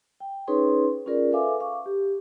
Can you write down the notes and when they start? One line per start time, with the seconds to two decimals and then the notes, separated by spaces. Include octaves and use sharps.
0.20 G5
0.47 C#4 D#4 G#4 B4 C#5 C6
1.06 C#4 F4 G#4 A#4 D5
1.32 A4 B4 E5 F5 G#5 D6
1.60 F5 C#6 D6
1.86 G4